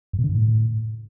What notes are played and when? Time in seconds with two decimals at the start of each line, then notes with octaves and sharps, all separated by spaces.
0.13 F#2
0.19 B2
0.24 D3
0.29 G2
0.35 A2